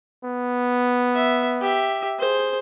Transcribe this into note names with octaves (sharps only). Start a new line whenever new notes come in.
B3
E5
G4 E5
G#4 C5